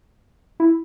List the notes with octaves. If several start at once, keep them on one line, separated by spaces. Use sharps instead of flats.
E4